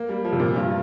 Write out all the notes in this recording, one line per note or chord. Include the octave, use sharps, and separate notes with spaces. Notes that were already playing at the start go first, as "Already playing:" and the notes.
Already playing: A#3
G3
F3
C3
A#2
G2